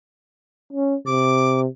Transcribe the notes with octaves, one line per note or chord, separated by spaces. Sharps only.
C#4
C3 D6